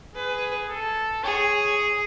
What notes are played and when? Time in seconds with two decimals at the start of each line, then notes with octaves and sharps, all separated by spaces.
0.15 G#4 B4
0.69 A4
1.24 G#4 C#5